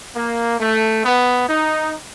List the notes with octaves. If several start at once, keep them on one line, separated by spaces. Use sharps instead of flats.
A#3
A3
B3
D#4